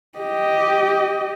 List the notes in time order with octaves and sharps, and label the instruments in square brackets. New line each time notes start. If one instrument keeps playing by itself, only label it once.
[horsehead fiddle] G4 D#5